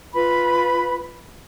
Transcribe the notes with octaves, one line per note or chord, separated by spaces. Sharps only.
F4 B4 B5